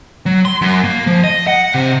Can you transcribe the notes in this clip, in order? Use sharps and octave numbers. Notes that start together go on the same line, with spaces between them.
F#3
C6
F#2
A#3
F3
D#5
F#5
C3